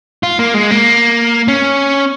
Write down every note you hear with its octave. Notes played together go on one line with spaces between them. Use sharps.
F4
A#3
G#3
A#3
C#4